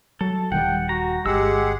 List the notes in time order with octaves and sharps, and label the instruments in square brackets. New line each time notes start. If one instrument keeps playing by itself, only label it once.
[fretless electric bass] F#3 [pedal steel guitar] A4
[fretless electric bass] D#1 D#3 G3 [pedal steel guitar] F#5 [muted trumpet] G5
[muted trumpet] F#4 [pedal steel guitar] A#5
[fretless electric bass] G1 [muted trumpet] G#3 [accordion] G4 G#4 F#5 [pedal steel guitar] E6